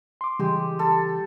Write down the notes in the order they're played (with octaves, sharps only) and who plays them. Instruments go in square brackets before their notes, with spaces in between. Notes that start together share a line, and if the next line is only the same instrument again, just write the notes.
[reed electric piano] C6 D6
[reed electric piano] C#3 E3 G3 [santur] G#3 G4
[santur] A4